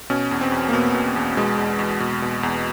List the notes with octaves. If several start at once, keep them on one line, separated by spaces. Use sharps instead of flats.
B2 C#4
E2
C4
E2
A#3
B2 B3
B2
E2
B2 G#3
E2
E2
B2
B2
E2